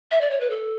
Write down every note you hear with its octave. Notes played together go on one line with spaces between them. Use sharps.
E5
D5
C#5
B4
A4